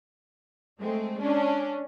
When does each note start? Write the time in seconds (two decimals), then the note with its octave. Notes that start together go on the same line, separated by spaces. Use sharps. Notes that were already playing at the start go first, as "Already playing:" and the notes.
0.79 G#3 A3 C4
1.20 C#4 D4